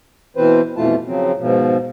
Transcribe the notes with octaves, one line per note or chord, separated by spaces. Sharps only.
B2 E3 C4 B4 C5
F2 B2 E3 A3 F4 A5
C#3 F3 F#3 C4
G#2 B2 F3